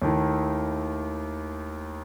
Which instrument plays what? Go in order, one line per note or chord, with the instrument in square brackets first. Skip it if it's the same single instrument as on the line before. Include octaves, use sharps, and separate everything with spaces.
[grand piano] D#2 D#3 A3 E4